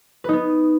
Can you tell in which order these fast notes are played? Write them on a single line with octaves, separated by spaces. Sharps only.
B4 D#4 B3